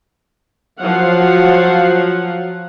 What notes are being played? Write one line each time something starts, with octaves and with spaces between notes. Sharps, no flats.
F3 F#3 F5 F#5